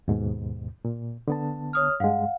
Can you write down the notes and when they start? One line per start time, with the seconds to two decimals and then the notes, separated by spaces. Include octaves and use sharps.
0.08 D#2 G#2 B2
0.85 A#2
1.28 D3 B3 A5
1.73 C#5 D#6 F6
2.00 G2 G#3 F5 F#5